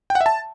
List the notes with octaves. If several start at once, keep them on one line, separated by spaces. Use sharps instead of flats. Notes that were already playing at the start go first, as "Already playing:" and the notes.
G5
F#5
E5
A5